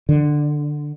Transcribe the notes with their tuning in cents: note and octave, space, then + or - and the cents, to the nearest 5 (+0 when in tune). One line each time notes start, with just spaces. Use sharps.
D3 +10